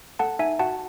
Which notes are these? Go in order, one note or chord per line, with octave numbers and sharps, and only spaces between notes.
A4 F#5 A5
D#4 E5 G#5
F#4 F#5 A5